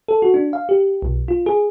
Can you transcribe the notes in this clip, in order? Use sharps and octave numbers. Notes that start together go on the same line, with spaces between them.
A4
F#4
D4
F5
G4
B1
F4
G#4